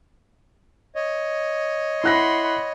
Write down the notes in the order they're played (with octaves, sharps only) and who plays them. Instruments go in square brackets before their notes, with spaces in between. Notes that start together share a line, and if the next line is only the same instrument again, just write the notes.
[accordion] C#5 D#5
[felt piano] E4 F#6 A#6 [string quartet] F#5 B5 C6